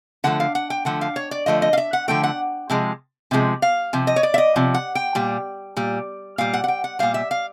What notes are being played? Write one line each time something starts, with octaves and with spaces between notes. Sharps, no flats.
D3 F3 A3 F#5
F5
F#5
G5
D3 F3 A3 F#5
F5
C#5
D5
D3 F3 A3 D#5
D#5
F5
E5
F#5
D3 F3 A3 G5
F#5
C3 F3 G#3
C3 F3 G#3
F5
C3 F3
D#5
C#5
D5
E5
D#5
C3 F3
F#5
G5
A#2 G3
A#2 G3
A#2 G3 F5
F#5
F#5
G5
F#5
A#2 G3 F5
E5
F5